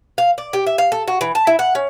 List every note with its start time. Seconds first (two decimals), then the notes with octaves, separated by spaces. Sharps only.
0.18 F5
0.38 D5
0.53 G4
0.67 E5
0.78 F5
0.92 A4
1.08 F#4
1.21 E3
1.35 A5
1.47 E4
1.59 F#5
1.75 C#4